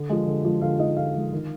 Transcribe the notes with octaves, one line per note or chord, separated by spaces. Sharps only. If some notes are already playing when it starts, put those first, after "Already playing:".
Already playing: D3
F3 G#3
D3
F3 G#3
D3 F4 F5
F3 G#3 D#4 D#5
D3 F4 F5
F3 G#3
D#3